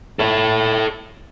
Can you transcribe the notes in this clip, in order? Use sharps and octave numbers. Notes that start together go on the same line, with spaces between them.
A4 C#5